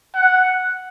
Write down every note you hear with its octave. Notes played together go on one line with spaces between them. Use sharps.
F#5